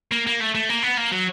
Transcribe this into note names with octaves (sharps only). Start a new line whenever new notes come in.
A#3
A#3
A3
A3
A#3
B3
A#3
F#3